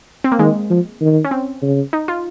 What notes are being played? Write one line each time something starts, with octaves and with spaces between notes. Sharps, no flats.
C4
A#3
D#3 G#3
F3
D#3
C#4
C4
C#3
D#4
F4